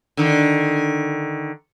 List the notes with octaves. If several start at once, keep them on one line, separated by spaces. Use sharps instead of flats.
D3 D#3